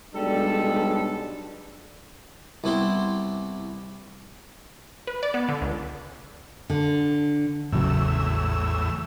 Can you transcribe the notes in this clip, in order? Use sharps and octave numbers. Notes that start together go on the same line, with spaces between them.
B1 G3 G#3 D4 A4
C2 B3 E4 G4 C6
B4
D5
B3
D3
C#2
D3
A1 E2 A2 C#3 F#3 E6